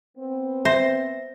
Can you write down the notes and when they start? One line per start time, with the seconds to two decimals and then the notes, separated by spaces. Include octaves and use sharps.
0.17 B3 C4
0.65 C5 E5 A#6